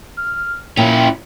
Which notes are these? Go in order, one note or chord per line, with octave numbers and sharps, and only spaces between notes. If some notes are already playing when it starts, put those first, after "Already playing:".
F6
A#2 C#4 E4 G5